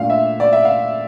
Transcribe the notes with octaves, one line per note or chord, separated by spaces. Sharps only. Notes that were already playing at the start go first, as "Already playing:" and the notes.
Already playing: A#2 A3 D4 F5
E5
D5
E5
F5